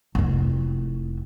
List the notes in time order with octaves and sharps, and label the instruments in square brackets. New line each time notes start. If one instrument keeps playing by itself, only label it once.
[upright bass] F1 E4